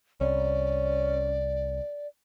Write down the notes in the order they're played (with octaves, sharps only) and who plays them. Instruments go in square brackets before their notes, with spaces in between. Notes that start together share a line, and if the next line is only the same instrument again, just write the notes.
[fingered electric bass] C2 [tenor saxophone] C#4 [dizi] D5